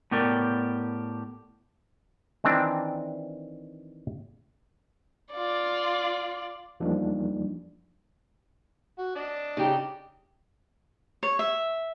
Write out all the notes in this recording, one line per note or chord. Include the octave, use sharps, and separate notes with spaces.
A2 B3 G4 A#4 D5
D#3 E3 C4 D4
F4 D5
E2 F3 G3 A#3 D4 D#4
F#4
D4 D#5
C#3 D#4 G4
C#5
E5